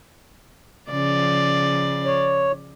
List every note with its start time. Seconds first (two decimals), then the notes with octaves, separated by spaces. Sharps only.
0.91 C#3 F3 D5
2.05 C#5